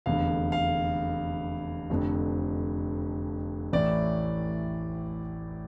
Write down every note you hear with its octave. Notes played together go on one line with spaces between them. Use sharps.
F1 E2 D3 F5
F5
F1 F2 D3
A1 A2 E3 D5